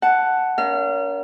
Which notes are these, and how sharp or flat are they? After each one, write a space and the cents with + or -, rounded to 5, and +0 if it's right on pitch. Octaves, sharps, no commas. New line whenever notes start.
F#5 +5 A5 +0
C#4 +40 A#4 +15 F5 -35